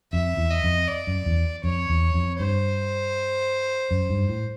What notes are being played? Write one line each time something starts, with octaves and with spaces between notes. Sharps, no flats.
F2 E5
E2
D#5
F2
D5
F#2
E2
F2 C#5
E2
F2
G2 C5
F#2
G2
A2